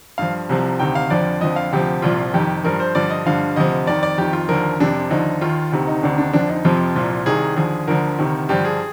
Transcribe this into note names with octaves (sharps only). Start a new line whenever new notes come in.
G2 F3 F5
C2 C3 F3
D2 C3 D#3 G5
F5
F2 D3 F3 D5
F2 D3 F3 D#5
F5
D2 C3 F3 G4
C2 A#2 F3 F4
F2 C3 D#3 G4
G2 F3 A#4
C5
G2 D3 F3 D5
D#5
G2 D3 F3 F5
D2 C3 F3 D#5
F2 D#3 D5
D5
F2 D#3 G4
F4
D#2 D3 F3 A#4
F2 C3 F3 D4
D#2 D3 F3 D#4
D#2 D#3 F4
D2 C3 D#3
D#4
D2 C3 D#3 D4
D4
F2 D3 F3 D4
D#4
F2 C3 F3 F4
C2 A#2 F3
C2 C3 D#3 G#4
D#2 D3 F3 G#4
D2 D3 F3 A#4
D2 C3 D#3
G2 D3 F3 G4
G#4